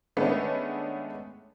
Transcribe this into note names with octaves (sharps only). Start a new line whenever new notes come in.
D#3 G#3 A3 B3 C#4 D4